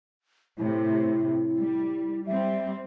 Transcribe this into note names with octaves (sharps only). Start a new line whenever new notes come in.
A2 C3 E4
G3
G3 C4 E5